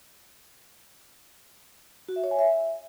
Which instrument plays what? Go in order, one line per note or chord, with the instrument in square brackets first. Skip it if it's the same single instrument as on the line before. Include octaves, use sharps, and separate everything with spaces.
[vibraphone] F#4
E5
C#5
G#5
E5